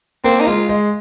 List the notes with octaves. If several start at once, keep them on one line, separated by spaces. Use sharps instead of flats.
A#3 C4
D#4
G#3 F4
G#3